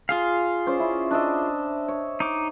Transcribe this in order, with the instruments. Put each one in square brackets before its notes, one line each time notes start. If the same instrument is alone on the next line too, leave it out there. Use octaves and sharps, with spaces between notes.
[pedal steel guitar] F4 G#4 F5
[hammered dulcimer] C#4 C5 D5
E4
D4 D#5 E5
C#5
[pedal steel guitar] D#4 D6